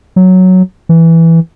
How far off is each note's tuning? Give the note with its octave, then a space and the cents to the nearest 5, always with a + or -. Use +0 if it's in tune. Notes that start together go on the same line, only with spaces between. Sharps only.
F#3 +0
E3 +0